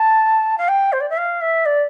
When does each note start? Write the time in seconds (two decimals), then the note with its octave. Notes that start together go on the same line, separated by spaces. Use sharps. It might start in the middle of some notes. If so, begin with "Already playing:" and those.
Already playing: A5
0.58 F5
0.68 G5
0.92 C5
1.00 D5
1.09 E5
1.17 F5
1.41 E5
1.65 D5